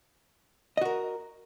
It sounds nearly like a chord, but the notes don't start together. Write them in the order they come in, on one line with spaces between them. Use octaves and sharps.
D#5 F#4 A#4